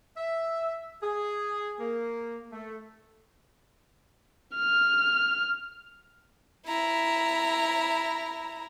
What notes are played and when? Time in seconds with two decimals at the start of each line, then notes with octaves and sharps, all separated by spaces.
0.17 E5
1.03 G#4
1.80 A#3
2.52 A3
4.56 F6
6.67 E4 A#5